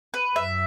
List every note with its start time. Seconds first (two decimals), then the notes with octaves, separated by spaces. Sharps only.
0.14 B4
0.36 F#2 E5